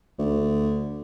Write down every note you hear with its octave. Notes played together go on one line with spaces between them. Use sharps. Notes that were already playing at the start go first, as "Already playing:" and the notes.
D2